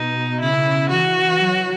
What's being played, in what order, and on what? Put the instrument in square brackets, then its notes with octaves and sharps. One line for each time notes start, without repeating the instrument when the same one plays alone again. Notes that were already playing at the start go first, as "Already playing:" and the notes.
Already playing: [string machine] B2 [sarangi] D#4
[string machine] C#3 [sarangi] E4
[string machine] E3 [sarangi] F#4
[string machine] F#3